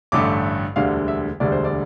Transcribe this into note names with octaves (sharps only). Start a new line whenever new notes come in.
A1 G2 D3 A3 D6
E1 D2 D3 G3 F5
E5
E1 D2 D3 G3 D5
C5
D5